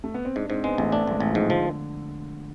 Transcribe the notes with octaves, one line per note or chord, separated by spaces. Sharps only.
A3
B3
C4
G#2 D4
G#2 C4
G#3 B3
A1 A3
A3 D4
A1 G#3
A1
G#2 F3
D3 F3